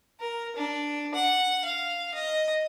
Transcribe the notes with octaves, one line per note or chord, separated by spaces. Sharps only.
A#4
D4
F#5
F5
D#5